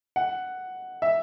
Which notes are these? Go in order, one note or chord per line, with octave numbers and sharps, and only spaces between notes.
F#5
E5